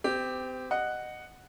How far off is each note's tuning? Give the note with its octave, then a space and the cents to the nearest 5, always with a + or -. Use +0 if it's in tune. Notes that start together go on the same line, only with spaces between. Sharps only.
C4 -35 G4 +0
D#5 -15 F#5 +0